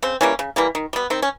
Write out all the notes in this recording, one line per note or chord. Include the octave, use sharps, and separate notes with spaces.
C#3 C4
E3 G3 A#3 C#4
C#3
E3 G3 A#3
D#3
G3 B3
D#3 C4
C#4